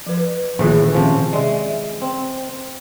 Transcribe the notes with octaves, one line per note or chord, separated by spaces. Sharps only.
F3 B4
A#1 A2 D#3 E3 F4 G#4
C3 F3 C#4
G#3 D5 E5
C4